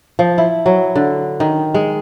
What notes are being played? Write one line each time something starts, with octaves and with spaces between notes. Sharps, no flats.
F3
E4
F#3
D3
D#3
G#3